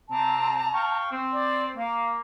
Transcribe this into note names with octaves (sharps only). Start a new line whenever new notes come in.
C3 C4 A5 A#5
F5 G5 C#6
C4
D5
A#3 F5